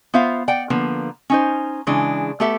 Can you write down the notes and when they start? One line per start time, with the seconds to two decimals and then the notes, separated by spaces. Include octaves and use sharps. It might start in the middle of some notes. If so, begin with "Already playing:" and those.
0.14 B3 F4 C5 E5 F5
0.48 D5 F#5 G5
0.70 D3 F3 A#3 B3
1.30 C#4 D#4 C5
1.87 C#3 E3 G#3 D4
2.40 A3 B3 G4 A4 E5